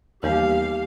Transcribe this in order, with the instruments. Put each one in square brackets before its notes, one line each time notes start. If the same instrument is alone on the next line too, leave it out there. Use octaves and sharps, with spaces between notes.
[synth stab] D#2 [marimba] E3 G3 B3 [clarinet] G4 [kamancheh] F5